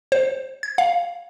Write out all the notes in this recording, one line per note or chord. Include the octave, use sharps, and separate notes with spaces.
C5
G#6
F5